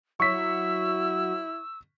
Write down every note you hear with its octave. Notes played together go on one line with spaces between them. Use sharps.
F#3 E4 C#6 E6 B6